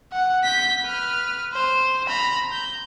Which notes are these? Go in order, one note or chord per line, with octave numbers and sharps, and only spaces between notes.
F#5
G6 B6
B4 F6
C5
A#5 B5
G6